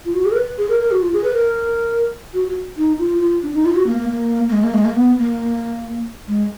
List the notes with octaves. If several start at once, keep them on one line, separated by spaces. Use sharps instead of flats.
F4
F#4
G#4
A#4
B4
G#4
A#4
A#4
F#4
F4
G#4
B4
A#4
F#4
F#4
D#4
F4
F4
D4
D#4
F4
F#4
A#3
A#3
A#3
A#3
G#3
A#3
G#3
A#3
B3
A#3
G#3